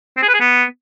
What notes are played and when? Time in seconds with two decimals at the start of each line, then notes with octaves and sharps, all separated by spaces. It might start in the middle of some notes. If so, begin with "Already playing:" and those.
0.17 C4
0.23 G#4
0.29 B4
0.34 G#4
0.40 B3